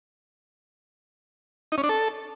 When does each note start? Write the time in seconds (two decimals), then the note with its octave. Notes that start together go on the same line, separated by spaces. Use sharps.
1.72 D#4
1.78 C#4
1.84 D4
1.89 A4